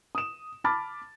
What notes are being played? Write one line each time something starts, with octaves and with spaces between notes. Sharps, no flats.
D#6 E7
A5 B5 D6 F6 A6